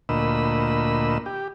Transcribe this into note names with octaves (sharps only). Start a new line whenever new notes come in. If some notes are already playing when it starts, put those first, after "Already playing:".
D2 A#2 D#5 B5 E6
G4